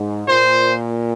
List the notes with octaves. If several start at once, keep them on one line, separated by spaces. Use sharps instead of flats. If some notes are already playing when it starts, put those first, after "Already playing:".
Already playing: G#2
A#2 C5